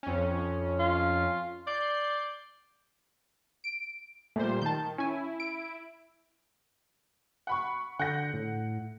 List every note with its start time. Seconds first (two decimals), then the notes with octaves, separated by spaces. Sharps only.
0.03 F2 C#4
0.79 F4
1.67 D5 G6 C7
3.64 D7
4.36 A#2 G3 A3 C5
4.62 D#3 A5 G6
4.98 C#4 E4 G#5
5.40 D7
7.47 F#5 B5 C#6
7.99 D3 F#5 G6 A#6
8.34 A2